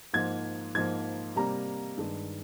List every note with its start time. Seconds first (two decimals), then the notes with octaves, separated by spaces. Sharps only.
0.13 G#2 F3 A#3 G#6
0.75 G#2 F3 A#3 G#6
1.36 C3 G3 A#3 A#5
1.98 G2 D#3 G#3